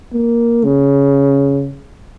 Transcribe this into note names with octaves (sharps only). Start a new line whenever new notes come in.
A#3
C#3